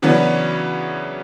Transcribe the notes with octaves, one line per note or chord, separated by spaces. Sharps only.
C#3 E3 F#3 B3 C#4 D4